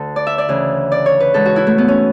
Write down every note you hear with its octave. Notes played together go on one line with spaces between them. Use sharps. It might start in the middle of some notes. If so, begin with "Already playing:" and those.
Already playing: D2 D3 A4
D5
E5
D5
D2 C#3 E3
D5
C#5
B4
G#2 E3 A4
F#4
E4
A3
B3
C#4